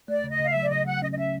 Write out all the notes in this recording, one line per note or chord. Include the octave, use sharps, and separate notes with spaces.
A3 D5
C#3
D#5
C#3 F5
E5
F#3
D5
C#3 D#5
F#3 F#5
C#4 D#5
D#5
C#4 E5